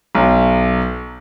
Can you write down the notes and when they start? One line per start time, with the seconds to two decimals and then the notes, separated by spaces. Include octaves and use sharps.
0.15 B1